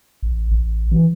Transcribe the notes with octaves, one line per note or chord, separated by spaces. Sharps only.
A1
A1
E3